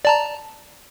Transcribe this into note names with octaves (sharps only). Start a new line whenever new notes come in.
D5 A5 A#5